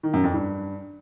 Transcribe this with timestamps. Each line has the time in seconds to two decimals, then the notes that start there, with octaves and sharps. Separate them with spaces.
0.03 D#3
0.13 F#2
0.24 F2
0.34 G2